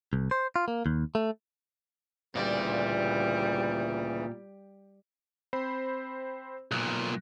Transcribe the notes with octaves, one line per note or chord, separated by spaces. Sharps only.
C2
C5
F4
A#3
D#2
A3
D2 A#2 C#3 E3 G3 D5
C4 C5 B5
B1 A#2 F#6